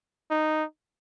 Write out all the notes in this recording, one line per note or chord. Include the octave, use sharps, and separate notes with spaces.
D#4